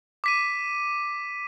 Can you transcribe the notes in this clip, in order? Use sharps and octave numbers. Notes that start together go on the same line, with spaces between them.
D6 B6 D#7